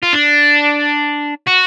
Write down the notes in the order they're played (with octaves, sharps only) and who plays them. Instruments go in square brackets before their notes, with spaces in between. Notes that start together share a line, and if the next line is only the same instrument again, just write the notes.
[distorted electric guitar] F4
D4
F#4